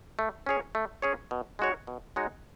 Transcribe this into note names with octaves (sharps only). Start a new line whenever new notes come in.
A3
C#4 G#4 C#5
A3
C#4 G#4 C#5
B2
G#3 D#4 F#4 C#5
B2
G#3 D#4 F#4 C#5